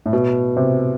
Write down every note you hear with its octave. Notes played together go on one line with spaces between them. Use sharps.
A2
B2
C3